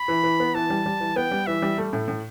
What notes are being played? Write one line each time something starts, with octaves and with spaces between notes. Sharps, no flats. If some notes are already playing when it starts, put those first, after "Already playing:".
Already playing: B5
E3
E3
B3
E3 A5
G3
G3
E3
B3 G5
G3
E3 E5
G3
A3
A2
A2